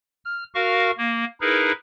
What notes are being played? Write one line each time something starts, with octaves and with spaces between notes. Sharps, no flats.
F6
F#4 A#4 F5 C#6 F6
A#3
D#4 E4 G#4 A#4 B4